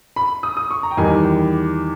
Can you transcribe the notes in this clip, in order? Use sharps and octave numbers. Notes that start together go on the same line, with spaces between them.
B5
D#6
D#6
C#6
A#5
G5
E2 D#3 G3 G#5
G5